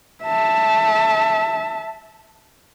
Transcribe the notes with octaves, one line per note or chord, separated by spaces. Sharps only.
E5 A5